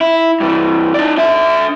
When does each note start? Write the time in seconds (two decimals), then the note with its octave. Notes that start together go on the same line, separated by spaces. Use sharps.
0.01 E4
0.40 G2 E3
0.94 D#4 D5
1.18 D4 E5